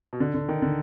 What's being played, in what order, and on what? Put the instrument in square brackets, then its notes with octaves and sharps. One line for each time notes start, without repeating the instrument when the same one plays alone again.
[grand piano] B2
D3
D3
D#3
D3